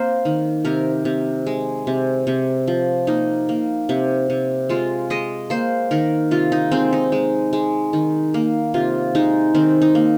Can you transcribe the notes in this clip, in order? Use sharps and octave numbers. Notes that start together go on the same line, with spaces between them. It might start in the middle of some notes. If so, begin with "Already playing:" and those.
Already playing: A#3 C4 A#4 C5
D#3
C3 A#4
C3
G#3
C3
C3
F3
A#3 D#4
A#3
C3
C3
G#3 F4
G#3 D#5
A#3 C5
D#3 A#4
C3 F4
D#4
G#3 C4
D#4
G#3
G#3
D#3
A#3
C3 F4
G#3 D#4
D#3 C4
D#4
A#3